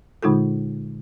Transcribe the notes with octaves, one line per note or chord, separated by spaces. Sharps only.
A#2 D3 G#3 D#4 F4 A4